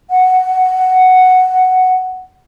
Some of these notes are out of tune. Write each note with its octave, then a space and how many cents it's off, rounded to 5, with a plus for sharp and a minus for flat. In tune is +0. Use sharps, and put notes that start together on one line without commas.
F#5 +5